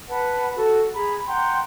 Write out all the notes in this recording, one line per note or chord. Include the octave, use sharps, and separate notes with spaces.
B4 F#5 A5
F#4 A4
G#4 A#5 B5
F#5 G5 A#5 C6